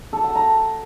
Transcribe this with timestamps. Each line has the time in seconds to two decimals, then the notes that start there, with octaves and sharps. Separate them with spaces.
0.13 A4
0.24 F#5
0.35 A#5